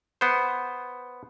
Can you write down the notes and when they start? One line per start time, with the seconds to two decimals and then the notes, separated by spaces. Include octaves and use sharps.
0.21 B3 C5